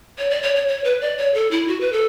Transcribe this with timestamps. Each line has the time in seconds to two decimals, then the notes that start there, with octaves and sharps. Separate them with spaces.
0.18 C#5
0.30 D5
0.42 C#5
0.56 C#5
0.68 C#5
0.84 B4
1.01 D5
1.17 C#5
1.34 A4
1.51 E4
1.68 F#4
1.80 B4
1.92 A4